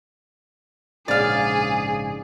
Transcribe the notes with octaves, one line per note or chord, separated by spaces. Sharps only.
A#1 G#2 C#3 G#4 D5 F5